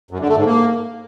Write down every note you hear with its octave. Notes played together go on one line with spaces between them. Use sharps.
F#2
D3
A3
G#2
A#3